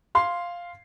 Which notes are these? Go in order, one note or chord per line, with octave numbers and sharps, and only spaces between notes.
F5 C6 C7